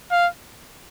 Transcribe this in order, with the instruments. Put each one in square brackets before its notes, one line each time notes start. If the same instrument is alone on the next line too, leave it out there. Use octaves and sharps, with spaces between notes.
[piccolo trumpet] F5